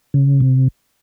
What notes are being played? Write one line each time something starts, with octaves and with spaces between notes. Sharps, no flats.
C#3
C3